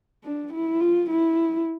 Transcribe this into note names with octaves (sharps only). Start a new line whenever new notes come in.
D4
E4
F4
E4